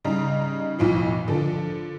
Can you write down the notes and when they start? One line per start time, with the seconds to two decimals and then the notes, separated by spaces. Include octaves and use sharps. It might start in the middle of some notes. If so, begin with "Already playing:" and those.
0.05 C#3 G3 D#4 A#5
0.79 B1 F2 A2 F3
1.28 D3 F3 A4